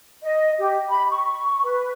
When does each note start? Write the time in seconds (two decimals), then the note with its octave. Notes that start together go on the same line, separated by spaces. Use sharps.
0.22 D#5
0.59 G4
0.88 B5
1.10 C#6
1.64 B4